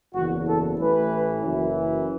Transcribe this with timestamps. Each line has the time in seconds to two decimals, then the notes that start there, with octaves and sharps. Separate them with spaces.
0.14 F#1 E2 E3 F#4
0.46 A4
0.79 A1 A2 E3 B4
1.44 F#1 F#2 E3